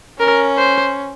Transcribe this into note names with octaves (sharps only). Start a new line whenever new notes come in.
C#4 A#4
C5